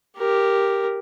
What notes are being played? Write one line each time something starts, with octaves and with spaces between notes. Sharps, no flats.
G4 A#4